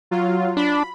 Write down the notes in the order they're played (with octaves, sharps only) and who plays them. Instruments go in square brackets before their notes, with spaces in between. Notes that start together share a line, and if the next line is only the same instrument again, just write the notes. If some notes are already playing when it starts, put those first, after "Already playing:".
[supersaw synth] F#3 F4
[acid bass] D4 [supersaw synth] B5